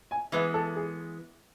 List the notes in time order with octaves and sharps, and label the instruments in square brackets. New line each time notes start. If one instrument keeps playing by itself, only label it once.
[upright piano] G#5
[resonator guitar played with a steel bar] E3 G#3 B3 [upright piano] B4
[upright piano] A4
G#4